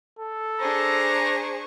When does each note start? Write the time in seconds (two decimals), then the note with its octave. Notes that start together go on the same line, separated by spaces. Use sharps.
0.19 A4
0.60 D4 G#4 C5 A#5 C#6